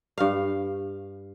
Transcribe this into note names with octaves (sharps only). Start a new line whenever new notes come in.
G2 F5